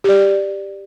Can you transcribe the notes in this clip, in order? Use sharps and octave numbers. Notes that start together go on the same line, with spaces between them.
G4 D5